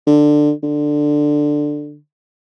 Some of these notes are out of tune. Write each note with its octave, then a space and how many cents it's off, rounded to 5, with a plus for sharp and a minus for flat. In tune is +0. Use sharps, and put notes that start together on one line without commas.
D3 +15
D3 +10